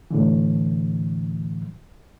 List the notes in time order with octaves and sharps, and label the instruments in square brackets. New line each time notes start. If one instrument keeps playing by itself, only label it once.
[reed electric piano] A2 D3 E3